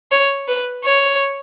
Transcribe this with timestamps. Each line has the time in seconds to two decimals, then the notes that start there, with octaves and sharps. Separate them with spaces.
0.12 C#5
0.48 B4
0.85 C#5